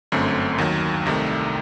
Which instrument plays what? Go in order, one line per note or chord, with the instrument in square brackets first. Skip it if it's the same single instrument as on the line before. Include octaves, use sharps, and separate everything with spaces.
[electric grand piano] G1 F#2 D3 A3 C4
D#2 D#3 F#3
C2 C3 D#3 A3